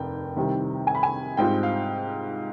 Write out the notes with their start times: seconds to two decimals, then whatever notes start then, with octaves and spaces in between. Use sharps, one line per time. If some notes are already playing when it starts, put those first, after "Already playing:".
Already playing: F1 D#2 D#3 G5
0.37 C2 C3 D#3 G3 C4
0.87 G#5
0.95 B5
1.03 G#5
1.37 G#2 G3 C4 F4 G5
1.63 F5